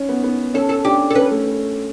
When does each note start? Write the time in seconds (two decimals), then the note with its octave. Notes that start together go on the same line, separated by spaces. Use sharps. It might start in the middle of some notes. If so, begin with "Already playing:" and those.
Already playing: C#4
0.09 B3
0.24 B3
0.54 C#4 A4
0.69 A4
0.85 D4 G4
1.10 A4
1.15 C#4 B4
1.31 A3